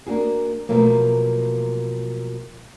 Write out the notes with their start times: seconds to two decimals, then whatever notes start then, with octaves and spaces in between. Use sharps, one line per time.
0.06 A#3 D4 F#4 G#4
0.69 B2 F3 F#3 A3 A#3